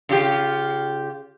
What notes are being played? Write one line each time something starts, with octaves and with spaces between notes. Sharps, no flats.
C#3 F4 G4